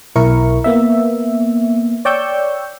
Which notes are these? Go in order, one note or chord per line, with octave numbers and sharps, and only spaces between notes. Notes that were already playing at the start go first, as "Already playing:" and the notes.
B1 E4 A#4 C#6
A#3 B3 E5
C#5 D5 G5 C#6 E6 G6